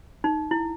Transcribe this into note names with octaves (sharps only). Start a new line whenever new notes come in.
D#4
E4